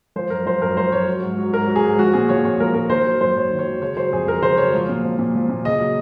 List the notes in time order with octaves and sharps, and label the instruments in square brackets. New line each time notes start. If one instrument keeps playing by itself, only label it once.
[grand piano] F3 C5
F#2 A#4
F3 C5
F#2 A#4
F3 C5
F#2 C#5
F#3
G#2
F#3
G#2 A#4
F#3
G#4
G#2
F3 F#4
A#2 G#4
F3 C#5
A#2 C#5
F3 A#4
A#2 A#4
D#3 C5
F#3
F#2 C5
F#2 C#5
D#3
C#5
F#3
C#3 C#5
F#3 C5
F2 G#4
F2 A#4
C#3 C5
F#3 C#5
F3
A#2
F3
A#2
F3
A#2
C#3 D#5
F#3